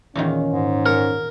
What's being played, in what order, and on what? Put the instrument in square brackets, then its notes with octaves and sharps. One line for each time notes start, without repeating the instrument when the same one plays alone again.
[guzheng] E2 A#2 D#3 [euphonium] C#4
[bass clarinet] G#2
[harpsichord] A#4 [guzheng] C#5